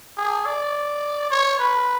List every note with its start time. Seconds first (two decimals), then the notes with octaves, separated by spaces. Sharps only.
0.18 G#4
0.46 D5
1.31 C#5
1.59 B4